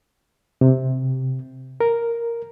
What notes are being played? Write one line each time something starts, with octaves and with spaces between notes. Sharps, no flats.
C3
A#4